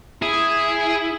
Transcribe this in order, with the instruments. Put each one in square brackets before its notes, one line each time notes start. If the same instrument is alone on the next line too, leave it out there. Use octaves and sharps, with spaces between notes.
[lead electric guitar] E4 [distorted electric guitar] G#4